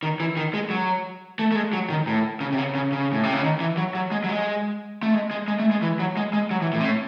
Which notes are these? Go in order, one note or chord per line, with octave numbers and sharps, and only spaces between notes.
D#3
E3
D#3
G#3
F#3
A3
A3
G#3
F#3
D#3
A2
C#3
C3
C#3
C#3
C#3
A2
C3
C#3
D#3
E3
F#3
F#3
G#3
F#3
G#3
A3
G#3
G#3
G#3
A3
G#3
E3
F#3
G#3
G#3
F#3
E3
A2
C3
A2